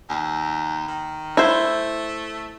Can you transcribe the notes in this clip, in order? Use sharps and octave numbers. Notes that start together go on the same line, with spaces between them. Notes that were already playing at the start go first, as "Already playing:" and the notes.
D#2
D#3
A3 E4 C5